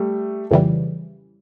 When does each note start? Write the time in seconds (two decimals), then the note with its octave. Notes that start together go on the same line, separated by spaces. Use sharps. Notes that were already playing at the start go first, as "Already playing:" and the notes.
Already playing: G3 A3
0.51 F2 C#3 E3 G3